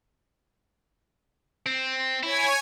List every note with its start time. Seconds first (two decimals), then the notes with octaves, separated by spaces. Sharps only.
1.66 C4
2.23 E4 C#5 G#5 G#6